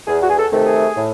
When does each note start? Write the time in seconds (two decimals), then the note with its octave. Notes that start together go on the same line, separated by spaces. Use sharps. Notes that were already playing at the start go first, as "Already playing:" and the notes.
0.07 E2 G#4
0.21 F#4
0.29 G#4
0.37 A4
0.52 C3 D#3 A3
0.66 G#4
0.97 A2